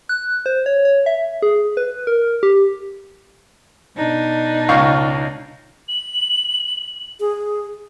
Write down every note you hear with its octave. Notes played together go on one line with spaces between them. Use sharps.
F#6
C5
C#5
C#5
E5
G#4
B4
A#4
G4
B2 D4 D#4
C#2 F5 C#6
F#7
G#4